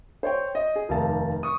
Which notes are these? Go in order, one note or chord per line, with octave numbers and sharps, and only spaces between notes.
C5 C#5 G5
D#5
G#4
F1 D#2 A#4 F5 A5
C#6 D#6